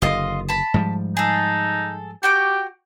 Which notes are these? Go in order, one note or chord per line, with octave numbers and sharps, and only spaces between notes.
F#1 D3 F4 D#5
A5 B5
G#2 F3 G3
D#4 G#4 A4
F#4 G4 G5 D6